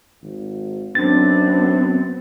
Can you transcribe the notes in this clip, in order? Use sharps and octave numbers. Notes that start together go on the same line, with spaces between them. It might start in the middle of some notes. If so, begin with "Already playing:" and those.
G#1
F#2 B3 C4 D4 A6